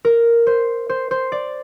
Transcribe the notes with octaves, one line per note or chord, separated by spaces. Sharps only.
A#4
C5
C5
C5
D5